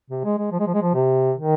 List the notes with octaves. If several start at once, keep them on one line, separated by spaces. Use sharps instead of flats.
C3
G#3
G#3
F3
G#3
F3
G#3
F3
C3
D#3